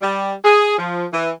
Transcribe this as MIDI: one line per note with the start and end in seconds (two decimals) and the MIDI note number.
0.02 0.33 55
0.44 0.78 68
0.78 1.06 53
1.13 1.31 52